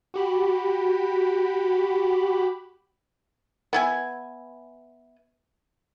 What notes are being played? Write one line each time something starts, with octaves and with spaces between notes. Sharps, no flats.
F#4 G4 B5
B3 E4 G#5